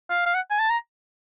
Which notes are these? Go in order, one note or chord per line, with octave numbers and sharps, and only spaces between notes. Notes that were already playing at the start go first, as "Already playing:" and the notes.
F5
F5
F#5
G#5
A5
A#5